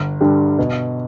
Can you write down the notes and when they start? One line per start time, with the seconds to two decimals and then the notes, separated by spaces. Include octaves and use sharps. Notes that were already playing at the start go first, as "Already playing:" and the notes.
Already playing: G1
0.21 G2 D3 G3
0.58 B2